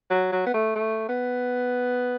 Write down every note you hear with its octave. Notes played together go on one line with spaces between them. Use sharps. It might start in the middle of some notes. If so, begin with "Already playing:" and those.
F#3
F#3
B3
A3
A3
B3